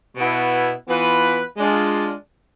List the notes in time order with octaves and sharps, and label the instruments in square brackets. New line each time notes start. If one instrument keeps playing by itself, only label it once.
[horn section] B2 B3 E4
E3 B3 F4 B4
G#3 D4 F4